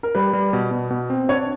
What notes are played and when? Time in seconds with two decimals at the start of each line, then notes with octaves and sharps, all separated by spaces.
0.03 A#4
0.15 G3 B4
0.33 G3
0.53 B2
0.71 B2
0.90 B2
1.10 C4
1.29 D4 C#5